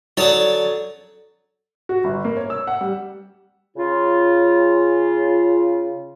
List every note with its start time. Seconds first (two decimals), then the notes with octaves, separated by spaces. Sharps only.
0.17 D3 F#3 C#5 D5 A5 D#6
1.89 F#4
2.04 G1
2.25 A#3
2.37 C#5
2.50 E6
2.67 F#5
2.81 G3
3.77 C#3 F4